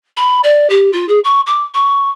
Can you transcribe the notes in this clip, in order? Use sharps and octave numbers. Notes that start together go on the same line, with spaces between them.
B5
D5
G4
F4
G#4
C#6
D6
C#6